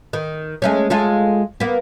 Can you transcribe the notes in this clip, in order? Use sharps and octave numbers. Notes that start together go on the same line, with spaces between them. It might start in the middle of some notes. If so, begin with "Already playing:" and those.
D#3
G#3 A3 C#4
G#3 F4 A4
A#3 B3